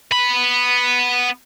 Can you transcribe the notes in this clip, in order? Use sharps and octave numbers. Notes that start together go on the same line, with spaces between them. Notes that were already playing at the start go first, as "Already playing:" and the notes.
B3 B5